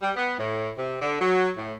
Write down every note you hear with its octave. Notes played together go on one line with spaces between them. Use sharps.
G3
B3
A2
C3
D3
F#3
A2